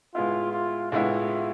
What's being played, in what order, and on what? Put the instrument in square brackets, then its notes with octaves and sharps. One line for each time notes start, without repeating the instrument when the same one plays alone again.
[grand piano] A2 G#3 B3 E4 [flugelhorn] F4
[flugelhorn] F4
[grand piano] A2 G#3 B3 E4 [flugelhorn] F4